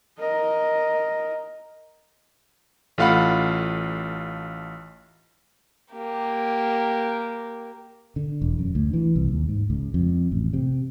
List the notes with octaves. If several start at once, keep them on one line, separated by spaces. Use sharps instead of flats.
A#4 D#5
A1 A3 F4 F5 F#5 B5
A#3 G4
D3
E1
F#2
D2
E3
C2
D#2
G#2
C#2
F2
A1
C3